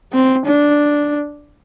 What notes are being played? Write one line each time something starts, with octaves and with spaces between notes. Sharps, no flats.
C4
D4